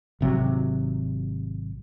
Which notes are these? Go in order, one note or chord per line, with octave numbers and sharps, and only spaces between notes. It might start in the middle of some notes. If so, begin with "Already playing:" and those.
G#1 C3 F#3